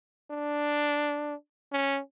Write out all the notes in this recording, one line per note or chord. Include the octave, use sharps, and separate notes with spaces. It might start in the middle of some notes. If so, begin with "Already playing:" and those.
D4
C#4